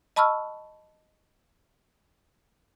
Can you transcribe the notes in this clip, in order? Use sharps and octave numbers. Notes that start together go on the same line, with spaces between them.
D#5 A5 B5 C#6 E6 F6